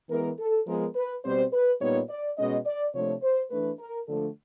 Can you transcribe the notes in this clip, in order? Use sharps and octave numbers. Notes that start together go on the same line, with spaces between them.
E3 G#3 B3 A#4
A4
F3 G#3 B3 A#4
B4
B2 G3 C4 C5
B4
A#2 G3 B3 D#4 C#5
D5
B2 G#3 C#4 D#5
D5
C3 F3 A3 D4 C#5
C5
E3 A3 D4 B4
A#4
D3 F3 A3 D4 A4